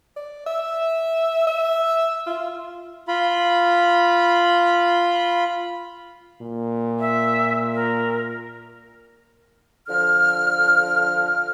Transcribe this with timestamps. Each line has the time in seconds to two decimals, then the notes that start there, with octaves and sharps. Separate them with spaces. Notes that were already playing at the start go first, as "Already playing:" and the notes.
0.16 D5
0.46 E5
1.47 E5
2.26 F4
3.08 F4 B5
6.41 A#2
7.00 E5
7.74 A#4
9.87 D3 F3 F6